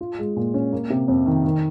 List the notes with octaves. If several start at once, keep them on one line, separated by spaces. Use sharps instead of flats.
F4
G#3
A#2
C#4
A#3
C3
F2
D#3
D#3